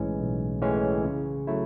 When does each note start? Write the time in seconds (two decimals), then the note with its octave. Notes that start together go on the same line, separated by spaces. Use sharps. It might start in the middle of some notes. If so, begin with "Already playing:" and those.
Already playing: B1 A2 E3 G#3 C#4
0.19 B1
0.61 A2 E3 G#3 C#4
1.04 C#3
1.47 F#3 A3 C#4 E4